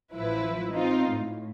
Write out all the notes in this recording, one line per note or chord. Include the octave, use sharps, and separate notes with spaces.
A1 F3 E4 B4
C4 D#4 F4
A2